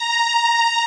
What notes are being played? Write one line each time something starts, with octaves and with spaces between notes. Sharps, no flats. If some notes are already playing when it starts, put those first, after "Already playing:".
Already playing: A#5